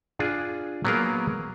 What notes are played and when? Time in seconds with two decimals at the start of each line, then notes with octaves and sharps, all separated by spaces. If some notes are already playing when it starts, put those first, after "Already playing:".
0.19 D4 F4 G#4
0.85 F#3 A#3 B3 G#4 A#4 F5